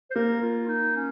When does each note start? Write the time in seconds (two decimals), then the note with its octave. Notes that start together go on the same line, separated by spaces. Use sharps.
0.11 C5
0.15 A#3 A#4
0.42 F4
0.68 D#4
0.96 C#4